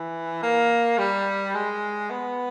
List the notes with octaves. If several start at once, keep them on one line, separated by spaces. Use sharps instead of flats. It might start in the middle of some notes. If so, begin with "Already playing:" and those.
Already playing: E3
A#3
G3
G#3
B3